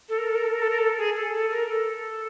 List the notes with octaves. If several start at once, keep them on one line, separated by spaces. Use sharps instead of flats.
A4
A#4
A4
A#4
A4
A#4
A4
A#4
A4
G#4
A4
A4
A#4
A4